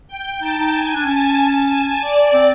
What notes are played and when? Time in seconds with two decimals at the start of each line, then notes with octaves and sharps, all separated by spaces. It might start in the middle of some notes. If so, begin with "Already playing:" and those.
0.08 G5
0.41 D#4 A5
0.57 D#4
0.73 G#5
0.83 D#4
0.94 D4
1.05 C#4 A5
1.68 G#5
2.01 D5
2.33 C4